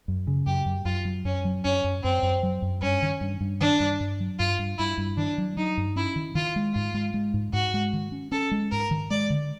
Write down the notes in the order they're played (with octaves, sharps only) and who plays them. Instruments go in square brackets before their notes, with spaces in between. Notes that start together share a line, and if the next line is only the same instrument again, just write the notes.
[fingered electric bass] F#2
C#3
[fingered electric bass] F#2 [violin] G4
[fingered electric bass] F#2
[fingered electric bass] F#2 [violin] F4
[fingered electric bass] F#3
[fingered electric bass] F#2 [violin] C#4
[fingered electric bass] F#3
[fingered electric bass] F#2 [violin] C#4
[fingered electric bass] F#2
[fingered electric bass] F#2 [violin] C4
[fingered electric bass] F#2
F#3
F#2
[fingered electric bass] G2 [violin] C#4
[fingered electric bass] D#3
G2
G2
[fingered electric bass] D#3 [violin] D4
[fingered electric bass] G2
G2
F#3
[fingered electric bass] G2 [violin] F4
[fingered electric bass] G2
[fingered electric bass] G2 [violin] E4
[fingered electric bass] G2
[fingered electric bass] D#3 [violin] D4
[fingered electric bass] F#3
[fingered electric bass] F#3 [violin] D#4
[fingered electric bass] G2
[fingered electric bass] C#4 [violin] E4
[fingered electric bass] D#3
[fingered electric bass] D#3 [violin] F4
[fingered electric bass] G#3
[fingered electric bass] G#2 [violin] F4
[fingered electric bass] G#3
G#3
G#2
[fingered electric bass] G#2 [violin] F#4
[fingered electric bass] G#3
D#3
C#4
[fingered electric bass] C#4 [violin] A4
[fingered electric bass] G#3
[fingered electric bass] G#2 [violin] A#4
[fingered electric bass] D#3
[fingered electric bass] G#3 [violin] D5
[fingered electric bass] D3